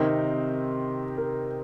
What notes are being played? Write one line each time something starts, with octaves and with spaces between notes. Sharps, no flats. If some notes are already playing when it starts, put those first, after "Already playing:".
Already playing: C3 D#3 C4 D#4 A#4
A#4